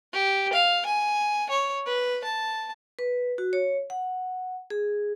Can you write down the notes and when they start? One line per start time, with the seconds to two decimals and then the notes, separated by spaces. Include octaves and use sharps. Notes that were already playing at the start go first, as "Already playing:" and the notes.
0.13 G4
0.53 F5
0.86 G#5
1.50 C#5
1.86 B4
2.24 A5
2.99 B4
3.38 F#4
3.53 C#5
3.90 F#5
4.70 G#4